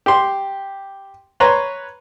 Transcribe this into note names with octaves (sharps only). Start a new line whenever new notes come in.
G4 C6
B4 C#5 A#5 C6